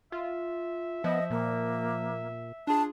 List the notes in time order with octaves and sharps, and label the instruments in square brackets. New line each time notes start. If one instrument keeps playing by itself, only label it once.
[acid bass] F4 [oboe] E5
[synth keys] F3 [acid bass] B3 [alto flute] D#5
[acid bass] A#2 [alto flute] A#3
[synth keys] D4 F4 G#4 [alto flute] A5